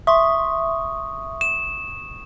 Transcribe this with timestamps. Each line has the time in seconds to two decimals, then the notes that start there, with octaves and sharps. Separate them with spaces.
0.07 E5 C6 C#6 D#6
1.41 E7